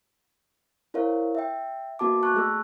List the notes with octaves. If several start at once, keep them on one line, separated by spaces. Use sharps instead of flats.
E4 A#4 C5 C#5 F5
E5 G5
A#3 B3 F#4 A5 D6
A5 C#6 F#6
A3 G#4 E6